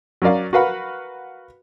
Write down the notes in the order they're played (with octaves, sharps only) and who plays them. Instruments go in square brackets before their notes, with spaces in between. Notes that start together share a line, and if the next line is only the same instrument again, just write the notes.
[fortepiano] F#3 C#4 A#4 D5 F5
F#4 A#4 B4 F5 F#5 B5